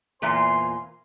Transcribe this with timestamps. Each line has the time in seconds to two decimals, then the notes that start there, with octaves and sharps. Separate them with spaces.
0.22 E2 A#2 F4 C5 G#5 C6